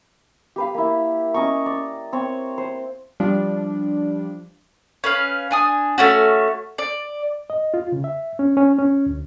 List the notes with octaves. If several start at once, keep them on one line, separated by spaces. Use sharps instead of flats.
G4 B4 F5
A#3 E4
C#4 D#5 A#5 C#6
D5
C4 C#5 C#6
C5
F3 G3 D4
C#4 B4 F5
D4 G#5 D#6
A3 C#4 F#4
D5
D#5
F4
C#3
E5
C#4
C#4
C#4
D2